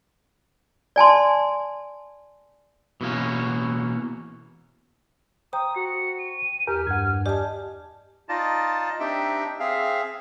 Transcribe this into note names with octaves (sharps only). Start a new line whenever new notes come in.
D5 G#5 A5 C6
B2 E3 A#3 C#4
C5 G5 A#5 D#6
F#4 C#7
D#7
E2 G4 A#4 F6
G2 F#5 G#6
G4 D5 D#5 G#5 A5
D#4 F4 D5 D#5 A5
C4 D4 D#4 G4 E5 G5
C4 G#4 E5 F5